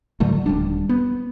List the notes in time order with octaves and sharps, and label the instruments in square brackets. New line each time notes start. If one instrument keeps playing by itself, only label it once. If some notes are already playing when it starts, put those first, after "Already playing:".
[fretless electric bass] A2 D3 F#3 A3
D#1 G3 D4
B3